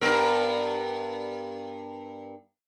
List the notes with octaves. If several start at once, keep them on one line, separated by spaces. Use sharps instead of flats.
G2 B3 A#4